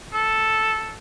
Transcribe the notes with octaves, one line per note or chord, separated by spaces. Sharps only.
A4